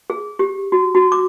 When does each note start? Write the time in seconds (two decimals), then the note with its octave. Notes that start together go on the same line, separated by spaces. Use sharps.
0.10 G#4
0.39 G4
0.72 F#4
0.95 F#4
1.12 D6